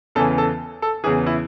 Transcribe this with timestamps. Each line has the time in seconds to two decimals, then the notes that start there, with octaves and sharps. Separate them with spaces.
0.15 E2 C#3 E3 A4
0.38 A4
0.82 A4
1.04 E2 C#3 E3 G#4
1.27 E4